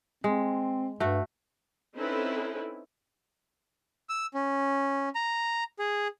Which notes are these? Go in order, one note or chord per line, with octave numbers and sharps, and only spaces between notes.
G#3 C4
G2 A3 F#4
C4 C#4 D#4 E4 A4 B4
E6
C#4
A#5
G#4